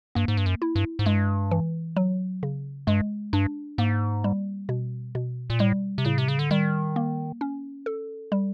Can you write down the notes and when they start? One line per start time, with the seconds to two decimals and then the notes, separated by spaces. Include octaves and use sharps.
0.15 G2 A#3
0.28 G#2
0.37 G2
0.46 F#2
0.62 E4
0.76 G2
0.99 G#2
1.06 G2 G#3
1.51 E3
1.96 F#3
2.43 C#3
2.87 G2 G#3
3.33 G2 D4
3.78 G#2 A#3
4.24 G3
4.69 B2
5.15 B2
5.50 A#2
5.59 A2 G3
5.98 C3
6.05 A2 C#3
6.18 C3
6.28 C#3
6.39 D3
6.51 D#3 G3
6.96 A#3
7.41 C#4
7.86 A4
8.32 G3